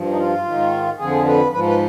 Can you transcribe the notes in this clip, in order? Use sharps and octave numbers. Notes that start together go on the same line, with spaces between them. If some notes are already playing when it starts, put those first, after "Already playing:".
Already playing: G2 F3
D#4
F4
G#2 D#3
F2 D3 F3 G#4
B4
G#2 F3 B4
B4